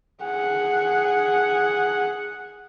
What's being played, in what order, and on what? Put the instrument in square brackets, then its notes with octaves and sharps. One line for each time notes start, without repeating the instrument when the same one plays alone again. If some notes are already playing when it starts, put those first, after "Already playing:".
[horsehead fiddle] G#4 F#5